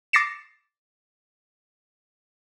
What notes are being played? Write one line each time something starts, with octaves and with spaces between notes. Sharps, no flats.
D6 A6 A#6 C7 C#7 E7